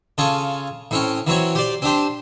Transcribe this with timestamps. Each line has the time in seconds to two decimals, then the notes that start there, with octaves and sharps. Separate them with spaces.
0.18 C#3 F4 A4 G#5 C#6
0.91 A2 C4 C#4
1.27 E3 F#3 C4 C#5
1.55 G4 C5 D5
1.82 C4 D4 G4 C5